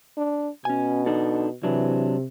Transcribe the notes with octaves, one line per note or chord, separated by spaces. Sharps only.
D4
B2 C#4 G#5
D4 D#4 A4
C3 E3 F#3 D4